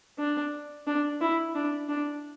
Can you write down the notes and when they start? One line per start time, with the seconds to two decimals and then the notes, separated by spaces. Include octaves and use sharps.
0.19 D4
0.87 D4
1.21 E4
1.55 D4
1.89 D4